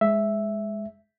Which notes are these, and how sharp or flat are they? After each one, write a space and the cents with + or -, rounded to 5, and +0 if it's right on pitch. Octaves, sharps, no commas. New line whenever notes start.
G#3 +0 E5 +0